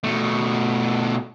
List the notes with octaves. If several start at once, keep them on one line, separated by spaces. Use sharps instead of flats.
B2 A3